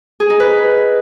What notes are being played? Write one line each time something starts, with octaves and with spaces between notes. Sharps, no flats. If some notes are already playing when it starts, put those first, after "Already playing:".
G#4
D#4
B4